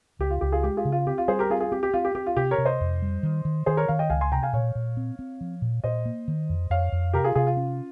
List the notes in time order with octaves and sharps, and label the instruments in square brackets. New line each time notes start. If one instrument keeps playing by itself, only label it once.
[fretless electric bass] C#2 [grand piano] G4
[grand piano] F4
[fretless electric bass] C#2 [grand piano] G4
[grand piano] F4 G#4
[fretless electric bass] G#3 [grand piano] G4
[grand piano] F4 G#4
[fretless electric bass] C#3
[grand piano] F4
[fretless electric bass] C4 [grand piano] G4
[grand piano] F4
[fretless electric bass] G3 [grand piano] G#4 C5
[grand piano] G4 A#4
[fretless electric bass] C4 [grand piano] F4 G#4
[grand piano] F4 G#4
[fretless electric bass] C4 [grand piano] G4
[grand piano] G4
[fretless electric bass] C4 [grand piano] F4
[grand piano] G4
[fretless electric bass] C4 [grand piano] G4
[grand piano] F4
[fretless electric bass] C3 [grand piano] G4
[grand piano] A#4 C#5
[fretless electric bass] C3
[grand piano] C5 D#5
[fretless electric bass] F2
G3
D#3
D#3
[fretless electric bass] D#3 [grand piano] G#4 C5
[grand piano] A#4 C#5
[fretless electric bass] D#3 [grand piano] C#5 F5
[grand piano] D#5 G5
[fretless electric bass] C#2 [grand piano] F5 G#5
[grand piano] G#5 C6
[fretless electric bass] C3 [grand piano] G5 A#5
[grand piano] F5 G#5
[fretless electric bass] A#2 [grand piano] C#5 F5
[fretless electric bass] A#2
C4
C4
F3
A#2
[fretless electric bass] A#2 [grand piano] C5 D#5
[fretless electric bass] A#3
D#3
F2
[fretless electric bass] F2 [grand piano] C#5 F5
[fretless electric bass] F2
[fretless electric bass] C3 [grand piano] G4 A#4
[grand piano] F4 G#4
[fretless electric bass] C3 [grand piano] F4 G#4
[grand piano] F4
[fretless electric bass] C#4